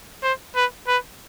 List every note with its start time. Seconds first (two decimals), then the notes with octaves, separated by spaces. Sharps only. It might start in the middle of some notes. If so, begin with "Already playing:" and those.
0.23 C5
0.56 B4
0.88 B4